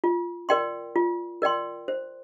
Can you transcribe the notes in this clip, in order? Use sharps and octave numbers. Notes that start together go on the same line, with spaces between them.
F4
A#4 D5 G5 C6
F4
A#4 D5 G5 C6
C5